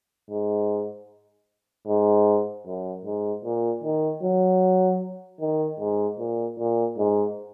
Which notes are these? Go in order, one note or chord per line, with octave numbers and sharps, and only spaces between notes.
G#2
G#2
F#2
G#2
A#2
D#3
F#3
D#3
G#2
A#2
A#2
G#2